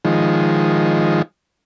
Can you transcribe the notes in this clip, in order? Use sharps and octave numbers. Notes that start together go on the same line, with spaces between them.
D#3 F3 G#3